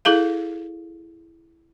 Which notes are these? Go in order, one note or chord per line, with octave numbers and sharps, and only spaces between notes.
E4 G#4 A4 F5